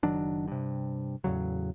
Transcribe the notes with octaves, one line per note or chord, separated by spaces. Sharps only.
F#1 D#3 F#3 D4
G2 C3
E2 A2 C#3 F#3